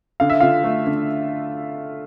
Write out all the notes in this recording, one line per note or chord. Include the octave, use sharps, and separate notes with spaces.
D3 F5
E5
D3 F4 F5
A3
D3